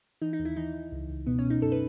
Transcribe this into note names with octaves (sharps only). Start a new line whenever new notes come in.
E3 D#4
D#4
D#2
E4
E3 D#4
E3
C#2
C#2
B2 B3
C#4
B2
D#4
F#2 A4
B4